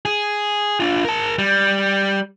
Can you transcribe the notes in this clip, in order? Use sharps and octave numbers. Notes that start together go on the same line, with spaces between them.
G#4
D4 F4
A#4 A5
G3